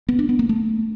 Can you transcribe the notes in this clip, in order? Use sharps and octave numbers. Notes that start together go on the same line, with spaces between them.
B3
D4
B3
A#3
A3